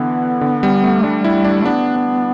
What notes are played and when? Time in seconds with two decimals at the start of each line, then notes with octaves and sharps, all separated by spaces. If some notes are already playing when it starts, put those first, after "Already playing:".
Already playing: D3 E3 B3
0.41 D3
0.63 G3
0.84 A3
1.04 G3 D4
1.24 E4
1.45 D4
1.65 B3 D4
1.96 D4